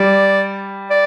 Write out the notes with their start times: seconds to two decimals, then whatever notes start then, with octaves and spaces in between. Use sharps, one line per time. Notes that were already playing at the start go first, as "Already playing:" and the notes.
Already playing: G3 D5
0.90 D5